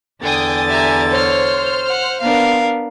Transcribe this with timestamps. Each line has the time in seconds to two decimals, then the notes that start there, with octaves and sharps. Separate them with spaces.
0.23 E2 D3 G5 G#5 D#6 A6
0.69 G4 E5 G#5 A#5
1.10 C5 C#5 F6
1.88 F#5
2.21 B3 D4 A#4 F5